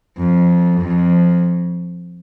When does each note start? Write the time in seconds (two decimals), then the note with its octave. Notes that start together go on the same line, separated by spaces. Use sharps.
0.18 F2
0.81 F2